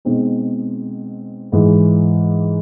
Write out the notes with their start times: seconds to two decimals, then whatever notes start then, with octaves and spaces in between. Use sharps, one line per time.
0.05 B2 G#3 C4 D#4
1.52 G#2 E3 G#3